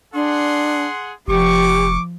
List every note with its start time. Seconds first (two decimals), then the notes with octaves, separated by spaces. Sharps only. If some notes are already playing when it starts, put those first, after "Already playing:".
0.14 D4 G#4 F#5 C6
1.28 F1 F3 G4 C#6 D6